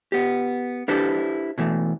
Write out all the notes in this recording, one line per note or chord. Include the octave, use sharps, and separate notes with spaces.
B3 G4
D4 E4 G4 A4 B4 C5
B2 E3 A3